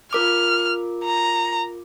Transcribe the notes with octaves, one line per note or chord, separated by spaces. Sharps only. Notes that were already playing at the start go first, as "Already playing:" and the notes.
F4 A#4 D6 F6
A#5